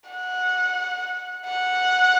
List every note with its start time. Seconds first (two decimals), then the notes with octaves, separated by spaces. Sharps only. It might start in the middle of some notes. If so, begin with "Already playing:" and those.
0.10 F#5
1.46 F#5